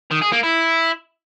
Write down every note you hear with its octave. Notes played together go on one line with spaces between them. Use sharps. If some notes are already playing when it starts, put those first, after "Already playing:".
D#3
G#4
A#3
E4